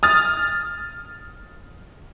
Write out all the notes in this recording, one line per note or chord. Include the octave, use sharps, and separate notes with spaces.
D#6 F6 A6